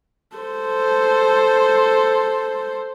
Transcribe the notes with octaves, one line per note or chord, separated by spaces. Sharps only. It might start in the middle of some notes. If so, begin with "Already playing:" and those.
A4 C5